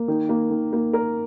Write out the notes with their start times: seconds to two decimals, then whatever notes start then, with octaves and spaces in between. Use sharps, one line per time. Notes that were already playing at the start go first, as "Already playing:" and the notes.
Already playing: A#3
0.08 D#3
0.29 A#3
0.50 D#3
0.73 A#3
0.93 A#4